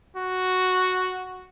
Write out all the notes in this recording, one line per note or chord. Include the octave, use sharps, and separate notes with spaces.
F#4